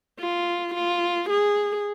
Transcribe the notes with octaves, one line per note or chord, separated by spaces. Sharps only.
F4
F4
G#4